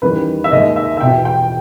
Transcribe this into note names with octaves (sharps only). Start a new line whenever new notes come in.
E2 D#3 G3 C#4 B4
E5
D#2 D#3 G#3 D#5
E5
E5
E1 E2 B2 G5
G5